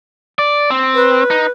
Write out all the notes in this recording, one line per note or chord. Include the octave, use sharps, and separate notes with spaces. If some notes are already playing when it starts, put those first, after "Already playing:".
D5
C4
B4
D#4